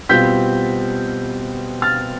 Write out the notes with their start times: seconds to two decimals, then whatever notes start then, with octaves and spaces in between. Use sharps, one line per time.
0.09 B2 G3 C4 F4 G6 B6
1.82 F6 A6